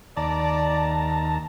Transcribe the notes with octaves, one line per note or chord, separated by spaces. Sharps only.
D#2 D5 A5 A#5